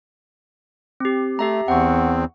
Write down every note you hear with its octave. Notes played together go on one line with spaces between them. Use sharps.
C4 G4
A3 G4 E5 A#5
E2 C4 F#5 C#6